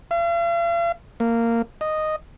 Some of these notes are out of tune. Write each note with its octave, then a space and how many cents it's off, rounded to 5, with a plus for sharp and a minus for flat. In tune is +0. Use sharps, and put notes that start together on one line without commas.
F5 -45
A#3 -15
D#5 -5